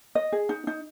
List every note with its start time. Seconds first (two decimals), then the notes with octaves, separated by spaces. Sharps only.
0.15 D#5
0.32 G#4
0.49 D#4
0.67 D#4